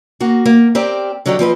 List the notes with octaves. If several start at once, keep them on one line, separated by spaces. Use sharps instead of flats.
A#3 F#4
A#3
C4 G4 A#4 D5
D3 F#3 D#4 G4 D5
F3 C4 B4 D#5